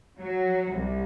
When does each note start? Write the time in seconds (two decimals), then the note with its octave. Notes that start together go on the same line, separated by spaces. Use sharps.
0.21 F#3
0.74 C2